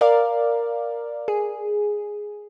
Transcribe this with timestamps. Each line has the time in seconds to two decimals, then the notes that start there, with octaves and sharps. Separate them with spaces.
0.01 A#4 D5 F5
1.28 G#4